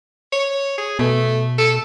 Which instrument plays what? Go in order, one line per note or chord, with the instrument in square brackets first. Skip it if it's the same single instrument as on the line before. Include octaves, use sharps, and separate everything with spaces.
[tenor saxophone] C#5
G#4
[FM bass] B2 [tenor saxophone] A3
[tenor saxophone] A4